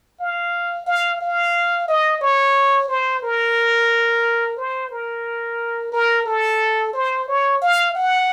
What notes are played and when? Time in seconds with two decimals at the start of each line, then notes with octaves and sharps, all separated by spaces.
0.20 F5
0.86 F5
1.21 F5
1.88 D#5
2.21 C#5
2.89 C5
3.23 A#4
4.57 C5
4.91 A#4
5.92 A#4
6.26 A4
6.93 C5
7.28 C#5
7.62 F5
7.95 F#5